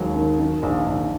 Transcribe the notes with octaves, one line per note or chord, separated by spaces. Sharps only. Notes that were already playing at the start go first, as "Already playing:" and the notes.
Already playing: D#2 F#3 G#3
D#3
D#3
A#1
A#1